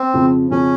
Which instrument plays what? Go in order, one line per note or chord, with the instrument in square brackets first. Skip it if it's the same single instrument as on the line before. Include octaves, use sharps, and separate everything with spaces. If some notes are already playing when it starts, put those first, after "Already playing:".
Already playing: [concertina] C4
[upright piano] F2 C#3 F3
[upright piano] F2 C#3 F3 [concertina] C#4